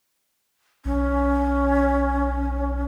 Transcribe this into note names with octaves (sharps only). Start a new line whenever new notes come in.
B1 C#4